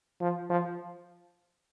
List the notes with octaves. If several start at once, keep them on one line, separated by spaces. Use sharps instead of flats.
F3
F3